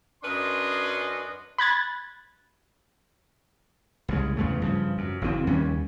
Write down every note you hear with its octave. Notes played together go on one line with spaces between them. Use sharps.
F#2 C#4 D4 B4 D#5 C6
B5 F#6 G#6 A6
C2 C#3 G#3
E2 C#3 A3
G2 C#3 F3
F#2
F#1 C#3 E3 C4
D#2 G3 C#4